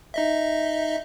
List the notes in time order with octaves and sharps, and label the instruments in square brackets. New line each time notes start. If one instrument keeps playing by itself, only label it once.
[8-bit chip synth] D#4 D#5 E5